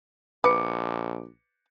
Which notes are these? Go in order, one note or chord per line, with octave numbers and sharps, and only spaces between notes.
A#1 B4 D6 C#7